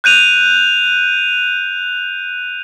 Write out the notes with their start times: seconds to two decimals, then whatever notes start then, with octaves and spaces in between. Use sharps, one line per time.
0.04 F#6 G6 D#7 F7